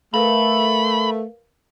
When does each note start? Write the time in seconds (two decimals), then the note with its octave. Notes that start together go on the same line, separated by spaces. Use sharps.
0.14 A3 A#4 B4 F5 B5